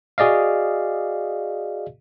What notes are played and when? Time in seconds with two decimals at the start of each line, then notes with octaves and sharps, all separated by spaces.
0.18 F#4 G#4 D5 D#5 F5